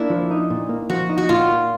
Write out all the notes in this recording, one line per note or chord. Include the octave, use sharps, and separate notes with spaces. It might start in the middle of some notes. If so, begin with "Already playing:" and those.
Already playing: A#3 D4 E4
F3
D#4
A#2
A#3
F3 F#4
D#4
F#4
A#2 F4
A#3